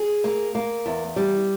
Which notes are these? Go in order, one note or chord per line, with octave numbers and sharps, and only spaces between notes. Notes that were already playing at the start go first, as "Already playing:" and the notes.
Already playing: G#4
A#3
A#3
E2
G3